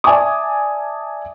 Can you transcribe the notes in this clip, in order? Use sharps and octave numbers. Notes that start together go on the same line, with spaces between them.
D5 E5 G#5 A5 D6 D#6